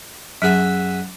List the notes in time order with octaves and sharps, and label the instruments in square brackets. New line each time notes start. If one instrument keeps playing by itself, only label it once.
[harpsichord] F#2 G#4 E5 [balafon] F#3 [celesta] F#5 F#6 B6